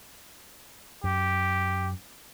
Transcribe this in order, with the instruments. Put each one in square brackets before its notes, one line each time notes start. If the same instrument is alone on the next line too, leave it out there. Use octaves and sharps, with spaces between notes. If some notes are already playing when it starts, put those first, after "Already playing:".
[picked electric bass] F#2 [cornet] G4